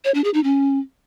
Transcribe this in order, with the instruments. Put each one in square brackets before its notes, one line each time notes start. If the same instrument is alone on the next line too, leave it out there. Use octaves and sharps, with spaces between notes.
[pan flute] C#5
D4
G#4
D#4
C#4